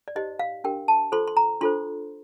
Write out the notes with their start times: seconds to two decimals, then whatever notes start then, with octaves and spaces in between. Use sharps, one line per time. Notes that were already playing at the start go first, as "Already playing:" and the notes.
0.08 D5
0.15 D#4 G4 C5 D#5
0.39 F5
0.64 D4 G4 A#4 G5
0.88 A5
1.12 F4 A4 C5 C6
1.28 C6
1.37 A#5
1.61 D4 F4 A4 C5 C6